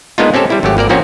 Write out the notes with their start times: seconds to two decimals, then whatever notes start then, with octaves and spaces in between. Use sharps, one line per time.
0.18 G#3 A#3 B3 D4 D#4 F4
0.34 C4 C#4 G4 A4 C5
0.50 G3 E4
0.63 G#1 F#3 A3 G4
0.77 G#1 A#3 A#4 D5
0.89 E3 F3 A#3 C4 C#4 F#4